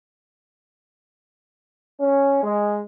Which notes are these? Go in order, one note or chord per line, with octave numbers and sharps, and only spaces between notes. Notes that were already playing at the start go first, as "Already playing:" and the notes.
C#4
G#3